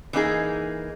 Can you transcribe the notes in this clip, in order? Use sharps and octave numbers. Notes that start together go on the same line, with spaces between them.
E3 A#3 D#4 G#4